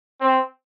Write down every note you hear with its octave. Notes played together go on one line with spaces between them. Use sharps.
C4